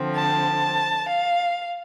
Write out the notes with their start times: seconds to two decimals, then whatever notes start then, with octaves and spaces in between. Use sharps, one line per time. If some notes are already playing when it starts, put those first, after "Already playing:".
Already playing: D3 F3 C4
0.15 A5
1.07 F5